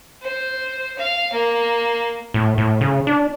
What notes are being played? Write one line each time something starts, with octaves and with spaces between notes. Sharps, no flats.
C5
F5
A#3
A2
A2
C#3
D4